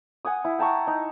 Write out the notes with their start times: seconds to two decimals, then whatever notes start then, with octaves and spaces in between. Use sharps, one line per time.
0.25 F#5 G#5 D#6
0.45 E4
0.59 G5 A5 A#5 C#6
0.87 D#4